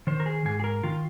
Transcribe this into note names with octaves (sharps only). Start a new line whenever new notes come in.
D#3 C5
A#4
G#4
G#2 G#4
G#4
A#4
D#3 F4